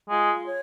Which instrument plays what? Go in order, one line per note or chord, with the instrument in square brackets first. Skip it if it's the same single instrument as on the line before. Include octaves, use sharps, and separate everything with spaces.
[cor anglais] G#3 [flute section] F4 F5
[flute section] C#5